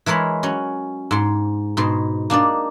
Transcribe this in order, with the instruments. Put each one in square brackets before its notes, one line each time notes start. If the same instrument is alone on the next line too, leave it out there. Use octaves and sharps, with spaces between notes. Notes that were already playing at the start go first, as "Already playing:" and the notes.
[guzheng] E3 G#3 A#4 C#5 B5
F#3 C#4
G#2 C6
G#2 B2 C6
A#3 D4 D#4 D5